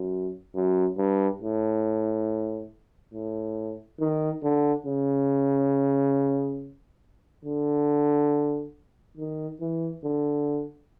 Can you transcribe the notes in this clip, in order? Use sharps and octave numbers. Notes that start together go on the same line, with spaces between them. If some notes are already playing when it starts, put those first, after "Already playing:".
Already playing: F#2
F#2
G2
A2
A2
D#3
D3
C#3
D3
D#3
E3
D3